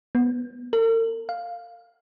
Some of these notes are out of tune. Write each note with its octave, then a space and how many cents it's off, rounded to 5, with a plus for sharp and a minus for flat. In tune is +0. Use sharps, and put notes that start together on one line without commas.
B3 -15
A#4 -45
F5 +0